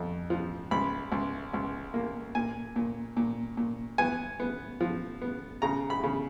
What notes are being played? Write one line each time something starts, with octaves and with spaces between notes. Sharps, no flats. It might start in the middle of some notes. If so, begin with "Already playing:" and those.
Already playing: F2
F3
C#2 B5
C#2
C#2
A#3
A#2 G#5
A#2
A#2
A#2
B3 G#5
B3
F3
B3
C#3 A#5
B5
C#3